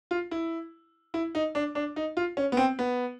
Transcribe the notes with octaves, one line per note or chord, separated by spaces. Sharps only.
F4
E4
E4
D#4
D4
D4
D#4
F4
C#4
B3
C4
B3